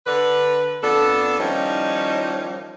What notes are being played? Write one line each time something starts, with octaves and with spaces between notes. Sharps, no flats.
D3 B4
F2 B3 D4 A4
D#3 F3 G3 C#4 D#4 E4